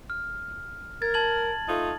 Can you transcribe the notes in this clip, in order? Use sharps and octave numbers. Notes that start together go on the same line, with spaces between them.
F6
A#4 G#6 A6
A5 G#6 F#7
A3 D#4 F4